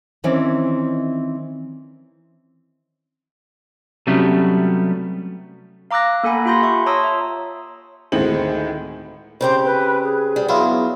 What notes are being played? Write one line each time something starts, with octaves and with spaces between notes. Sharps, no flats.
D#3 E3 C4 C#4 E4 D5
C3 F#3 G3 A3 B3 C#4
F5 A#5 D6 E6 F#6 A#6
A#3 A4 F#5 G#5 B5
F4 G4 B5 C6 G6 A#6
E5 C#6
C#5 A5 A#5 C6 D#6 E6
E5
D2 A2 D#3 G#3 C4 F#7
C#3 C4 G4 C5
B4
G#4
G3
F#3 B3 E4 F4